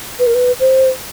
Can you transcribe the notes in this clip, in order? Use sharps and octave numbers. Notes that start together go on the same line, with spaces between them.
B4
A#4
B4
C5